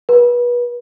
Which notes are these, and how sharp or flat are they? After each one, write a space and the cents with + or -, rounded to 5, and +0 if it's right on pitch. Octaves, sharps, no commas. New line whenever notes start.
B4 -30